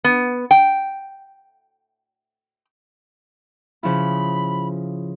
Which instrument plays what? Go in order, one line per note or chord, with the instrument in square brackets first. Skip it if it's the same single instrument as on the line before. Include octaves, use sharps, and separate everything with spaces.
[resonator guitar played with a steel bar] B3
G5
[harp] C#3 F3 E4 [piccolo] B5